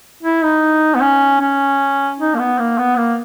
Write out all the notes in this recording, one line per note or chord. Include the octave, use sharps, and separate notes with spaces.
E4
D#4
B3
C#4
C#4
D#4
A#3
B3
A#3
B3
A#3